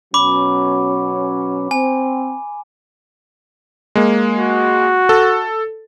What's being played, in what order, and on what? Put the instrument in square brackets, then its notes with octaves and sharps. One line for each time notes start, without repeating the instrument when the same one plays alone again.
[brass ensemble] B2 F#3 C#4 [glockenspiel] B5 D6
[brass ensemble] C4 [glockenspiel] G#5
[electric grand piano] G#3 A#3
[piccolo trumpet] F#4
[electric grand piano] A4